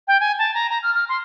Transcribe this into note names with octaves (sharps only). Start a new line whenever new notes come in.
G5
G#5
A5
A#5
A#5
F6
F6
C6